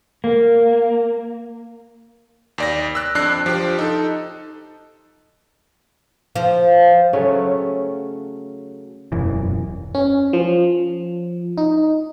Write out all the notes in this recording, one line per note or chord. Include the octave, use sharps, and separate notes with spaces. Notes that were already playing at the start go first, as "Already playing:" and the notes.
A#3
D#2 D5 A#6
E6 F#6
F2 D4 F#6 C7
F3 G4
D#4 A4
F3
C#3 F#3 A3 C#4
E1 F#2 E3
C#4
F3
D#4